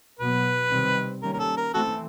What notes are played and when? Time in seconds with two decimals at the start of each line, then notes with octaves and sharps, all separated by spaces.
0.20 B2 F#3 B3 B4
0.71 C3 D#3 G3 C4
1.22 D#3 G3 A#3 C#4 A#4
1.34 A#4
1.39 A4
1.57 A#4
1.74 E3 A3 C4 F#4 A4